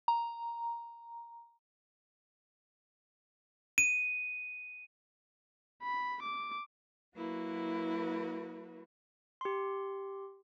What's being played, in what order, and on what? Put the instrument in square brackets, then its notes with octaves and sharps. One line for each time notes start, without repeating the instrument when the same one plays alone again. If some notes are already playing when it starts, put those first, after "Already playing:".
[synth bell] A#5
[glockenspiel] D#7
[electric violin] B5
D6
[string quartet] F#3 A#3 E4 F#4 B4
[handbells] G4 C6